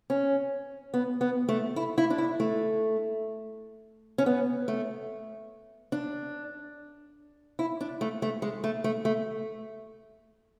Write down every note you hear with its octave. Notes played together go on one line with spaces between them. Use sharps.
C#4
B3
B3
A3
E4
E4
D4
E4
A3
C#4
B3
A3
D4
E4
D4
A3
A3
G#3
A3
A3
A3